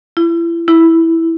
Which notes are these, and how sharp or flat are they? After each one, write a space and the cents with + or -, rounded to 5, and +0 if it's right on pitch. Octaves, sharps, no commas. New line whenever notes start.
E4 +35
E4 -5